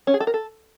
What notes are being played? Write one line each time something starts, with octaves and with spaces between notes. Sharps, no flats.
C#4
G#4
A4
A#4
A4